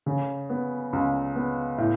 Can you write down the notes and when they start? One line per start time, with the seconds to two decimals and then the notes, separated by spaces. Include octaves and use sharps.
0.06 C#3
0.50 B3
0.93 C#2
1.36 B3
1.78 A2